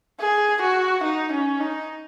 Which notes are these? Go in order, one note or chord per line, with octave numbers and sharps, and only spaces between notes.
G#4
F#4
D#4
C#4
D#4